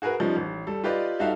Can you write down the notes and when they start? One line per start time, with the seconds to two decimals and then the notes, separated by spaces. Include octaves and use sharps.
0.02 F#4 G#4 A#4 B4 F#5
0.20 F3 G3 C#4 D#4
0.36 A1
0.67 G3 A4
0.84 F4 G4 B4 D5 D#5
1.19 G3 D#4 F#4 A4 E5 F5